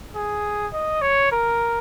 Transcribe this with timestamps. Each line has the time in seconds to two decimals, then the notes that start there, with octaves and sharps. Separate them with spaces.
0.15 G#4
0.73 D#5
1.02 C#5
1.32 A#4